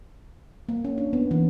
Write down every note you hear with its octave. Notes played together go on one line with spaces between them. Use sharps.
A#3
C#4
D4
B3
E3